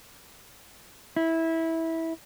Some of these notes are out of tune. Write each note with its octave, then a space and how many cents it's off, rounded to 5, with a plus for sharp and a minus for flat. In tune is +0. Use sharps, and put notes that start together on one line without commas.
E4 -15